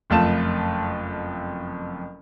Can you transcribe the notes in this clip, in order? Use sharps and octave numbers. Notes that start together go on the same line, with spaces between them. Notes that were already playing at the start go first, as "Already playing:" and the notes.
F#1 F2 A3 F4 A5 E7